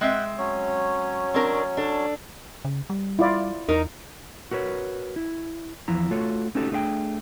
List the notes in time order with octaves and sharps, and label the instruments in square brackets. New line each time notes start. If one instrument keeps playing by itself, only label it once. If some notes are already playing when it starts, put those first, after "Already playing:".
[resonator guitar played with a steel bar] G#3 C4 E5 [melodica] F#5 G5
[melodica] F#3 C#4 C#5
[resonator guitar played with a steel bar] C4 D4 A#4
D4 A4
[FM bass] C#3
G3
[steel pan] E4 F4 D5
[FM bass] E2 [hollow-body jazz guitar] D#4 A#4
[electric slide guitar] F#4 A#4 B4 C#5
E4
E2 E3 F3 E4 A#5
A3 F4 F#4 A4 C#5
A3 C#4 D#4 F#4 G4 A4
A3 D4 G#4 E5 G5